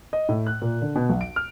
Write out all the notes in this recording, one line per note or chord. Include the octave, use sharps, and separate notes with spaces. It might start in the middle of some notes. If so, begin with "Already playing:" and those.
D#5
A2
F#6
A#2
D3
B2
B1
D7
F6